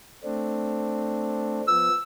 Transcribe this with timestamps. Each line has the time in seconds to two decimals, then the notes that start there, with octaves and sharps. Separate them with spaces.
0.24 A3 C4 D4
1.67 F3 B3 E6